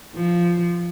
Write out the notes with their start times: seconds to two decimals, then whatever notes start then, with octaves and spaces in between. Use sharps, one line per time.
0.15 F3